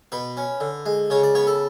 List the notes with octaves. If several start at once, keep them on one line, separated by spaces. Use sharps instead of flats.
B2 B4
C#4
D3
G#3
C#3 C#5
D5
B3 C#5
A4